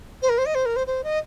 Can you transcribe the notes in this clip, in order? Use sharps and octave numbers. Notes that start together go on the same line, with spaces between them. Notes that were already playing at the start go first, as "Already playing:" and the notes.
C5
A#4
C5
D#5
C5
A#4
C5
C5
D#5